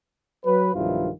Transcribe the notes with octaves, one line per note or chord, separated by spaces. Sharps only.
F#3 B4
B1 G2 D#3 F3 E4 F4